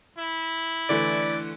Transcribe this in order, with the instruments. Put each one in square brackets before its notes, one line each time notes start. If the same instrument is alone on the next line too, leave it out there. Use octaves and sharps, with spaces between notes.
[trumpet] E4
[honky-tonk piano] D3 E3 A3 [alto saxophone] D5